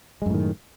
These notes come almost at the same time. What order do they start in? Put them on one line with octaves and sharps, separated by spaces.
G#3 F#2 A2 D#3